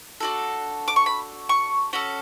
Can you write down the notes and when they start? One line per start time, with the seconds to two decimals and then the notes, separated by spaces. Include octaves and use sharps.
0.20 D4 F#4 A4
0.88 D6
0.96 C#6
1.06 B5
1.49 C#6
1.93 C#4 F#4 A4